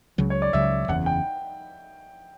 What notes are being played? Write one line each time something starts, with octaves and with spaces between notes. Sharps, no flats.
C#2 C#3 F#3
C#5
D5
C#2 C#3 F#3 E5
F#1 E2 C#3 F#5
G5